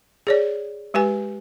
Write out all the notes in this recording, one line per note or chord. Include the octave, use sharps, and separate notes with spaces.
G#4 C#5 D5
G#3 G4 B4 G#5